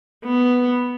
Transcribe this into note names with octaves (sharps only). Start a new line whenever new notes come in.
B3